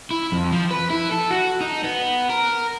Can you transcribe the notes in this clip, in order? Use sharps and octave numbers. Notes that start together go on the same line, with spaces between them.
E4
F2
F3
B4
E4
A4
F#4
D#4
B3
A#4